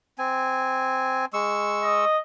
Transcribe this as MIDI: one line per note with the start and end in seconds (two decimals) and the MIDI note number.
0.18 1.25 60
0.18 1.25 80
1.33 2.05 56
1.33 2.05 85
1.33 2.05 88
1.83 2.20 75